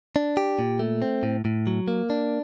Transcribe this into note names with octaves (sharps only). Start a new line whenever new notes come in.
D4
G4
A#2
A3
C4
A2
A2
F#3
A#3
D4